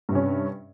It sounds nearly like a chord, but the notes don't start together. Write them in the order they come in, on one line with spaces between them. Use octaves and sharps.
G2 C3 C#4